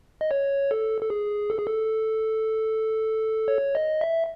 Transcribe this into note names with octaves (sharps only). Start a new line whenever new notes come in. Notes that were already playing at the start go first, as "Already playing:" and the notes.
D#5
C#5
A4
A4
G#4
A4
G#4
A4
C#5
D#5
E5